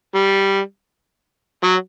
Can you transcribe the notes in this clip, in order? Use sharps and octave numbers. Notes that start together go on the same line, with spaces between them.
G3
F#3